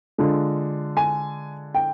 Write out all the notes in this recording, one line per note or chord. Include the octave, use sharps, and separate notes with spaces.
D3 G#3 D4 F4
G#5
G5